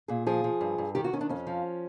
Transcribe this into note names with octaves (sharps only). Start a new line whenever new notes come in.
A#2 G#4
F3 G#4
F3
G2
G2
D#3 G4
F#4
D#3 C#4
D4
F2 C#4
F3